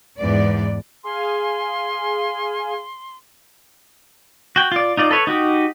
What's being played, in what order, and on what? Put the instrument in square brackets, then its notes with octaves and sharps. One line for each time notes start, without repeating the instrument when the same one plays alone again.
[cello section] E2 G#2 B3 D5
[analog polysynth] G#4 F5 G#5 [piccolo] C6
[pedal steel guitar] F#4 G5
F4 D5
D#4 F4 D5
A4 B4 C#5
D#4 F#4 G4